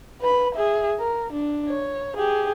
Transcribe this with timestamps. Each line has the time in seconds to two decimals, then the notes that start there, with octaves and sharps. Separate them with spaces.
0.21 B4 B5
0.55 G#4 E5
1.00 A#4
1.32 D4
1.68 C#5
2.16 G4 G#4